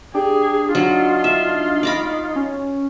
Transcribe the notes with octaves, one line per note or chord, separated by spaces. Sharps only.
D4 G4 G#4
F#3 D#4 F4
E5
D5 A#5 B5
C#4